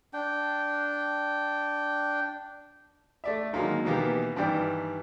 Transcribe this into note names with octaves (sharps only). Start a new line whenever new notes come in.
D4 G5
A3 D5 E5
D3 D#3 F#3 G#3 A#3 D#4
B2 D#3 E3 A#3 B3 G4
G2 D#3 E3 G3 D5 G5